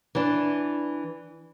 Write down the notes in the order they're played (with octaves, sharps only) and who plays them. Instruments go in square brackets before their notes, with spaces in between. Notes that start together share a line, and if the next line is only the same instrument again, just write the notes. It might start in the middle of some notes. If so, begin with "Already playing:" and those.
[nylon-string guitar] E3 D4